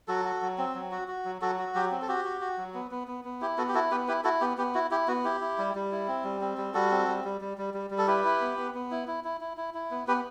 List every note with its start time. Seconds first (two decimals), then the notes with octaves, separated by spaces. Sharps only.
0.08 F#3 F#4 A4
0.25 F#4
0.42 F#3
0.58 C4
0.75 F#3
0.91 F#4
1.08 F#4
1.25 F#3
1.41 F#3 F#4 A4
1.58 F#4
1.75 F#3 G4
1.91 C4
2.02 A4
2.08 F#4 G4
2.25 F#4
2.41 F#4
2.57 F#3
2.74 B3
2.91 B3
3.08 B3
3.25 B3
3.41 E4 G4
3.58 B3 F#4 A4
3.69 G4
3.74 E4 F#4 A4
3.91 B3 G4 B4
4.08 E4 G4 B4
4.24 E4 F#4 A4
4.41 B3 G4
4.57 B3 G4
4.74 E4 F#4
4.91 E4 G4
5.08 B3 F#4
5.25 E4 G4
5.41 E4
5.58 G3
5.75 G3
5.91 E4
6.08 C4
6.24 G3
6.41 C4
6.58 G3
6.74 G3 F#4 A4
6.91 C4
7.08 G3
7.24 G3
7.41 G3
7.58 G3
7.74 G3
7.90 G3
7.98 A4
8.07 E4 G4 B4
8.25 E4
8.41 B3
8.58 B3
8.74 B3
8.91 E4
9.08 E4
9.24 E4
9.41 E4
9.57 E4
9.74 E4
9.91 B3
10.07 B3 G4 B4